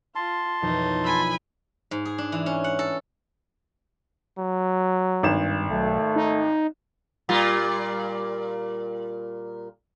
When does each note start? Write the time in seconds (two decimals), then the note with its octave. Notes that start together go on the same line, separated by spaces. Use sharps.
0.15 F4 A5 C6
0.62 B1 F2 E3 D#4
1.04 G#5 B5 E6
1.91 G#2
2.05 G#4
2.18 D4
2.32 E3
2.46 C#4
2.64 F#5
2.79 A4
4.38 F#3
5.23 G#1 G2 E7
5.70 B1 A3
6.16 D#4
7.29 A#2 G3 F4